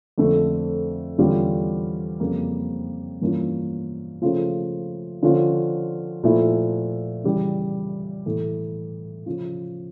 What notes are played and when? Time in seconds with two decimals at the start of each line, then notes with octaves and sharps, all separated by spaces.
0.18 F2 D3 A3
1.18 E2 D3 G3 C#4 F4
2.20 F2 C#3 G3 A#3
3.21 G2 E3 A#3 C#4 F4
4.22 C#3 F3 A3 C#4 F4
5.22 D3 F3 C#4 F4
6.23 A#2 F3 A3 E4
7.24 C#3 E3 G3
8.26 A2 E3 A3
9.26 C#3 F3 C#4 F4